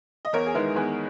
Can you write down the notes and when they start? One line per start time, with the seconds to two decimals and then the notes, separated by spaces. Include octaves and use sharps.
0.25 D#5
0.33 E2 A#4 C#5
0.46 G#4
0.54 D#3 G#3 B3 E4 A#4
0.75 E2 G#4 B4